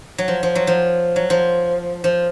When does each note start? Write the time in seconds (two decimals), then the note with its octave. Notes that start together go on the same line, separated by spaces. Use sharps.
0.18 F#3
0.28 F3
0.43 F3
0.55 F#3
0.67 F3
1.16 F#3
1.30 F3
2.04 F3